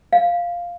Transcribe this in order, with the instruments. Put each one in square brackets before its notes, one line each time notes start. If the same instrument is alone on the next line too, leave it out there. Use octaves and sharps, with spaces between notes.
[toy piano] F5